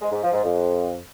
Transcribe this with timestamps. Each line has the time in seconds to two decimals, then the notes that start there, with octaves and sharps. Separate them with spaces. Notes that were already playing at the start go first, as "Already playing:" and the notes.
0.01 G#3
0.12 G#2
0.22 F3
0.33 G#2
0.43 F2